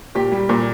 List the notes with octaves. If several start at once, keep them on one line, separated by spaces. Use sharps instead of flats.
A#2 G4
G3
A#2